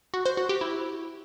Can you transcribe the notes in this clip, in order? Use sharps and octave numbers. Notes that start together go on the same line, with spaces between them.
F#4
C5
F#4
G4
E4